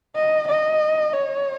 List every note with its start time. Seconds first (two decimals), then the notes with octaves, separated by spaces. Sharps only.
0.16 D#5
0.49 D#5
1.13 C#5